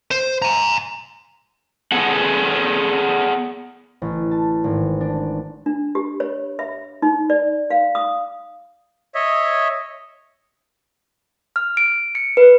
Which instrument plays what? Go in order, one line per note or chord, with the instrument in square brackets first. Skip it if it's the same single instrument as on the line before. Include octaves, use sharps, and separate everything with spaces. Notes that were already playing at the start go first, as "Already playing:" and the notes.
[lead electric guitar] C5
G#5 A#5
[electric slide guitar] B3 G#4 A4 F#5
[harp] A1
A5
G#1
D4
[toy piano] D4
G4
C#5
E5
D#4
D5
F5
D#6
[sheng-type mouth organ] C#5 D#5 E5
[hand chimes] F6
D7
C#7
B4